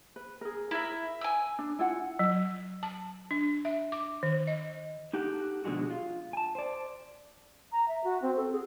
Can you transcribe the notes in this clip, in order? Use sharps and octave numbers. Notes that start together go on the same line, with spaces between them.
B4
G#4 A#4
E4 A#4 E5
G#5 E6
D4
E4 F4 F#5
F#3
A5
D4
E5
D6
D#3
D#5
D#4 G4 A4 F#5
B2 D3 F3 G#3 F#4
F4
G#5 A5
C5 D5
A#5
E5
F#4
C4
A4
G#4